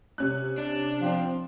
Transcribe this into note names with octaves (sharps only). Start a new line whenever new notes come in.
C3 C#4 F#6
D4
F3 C4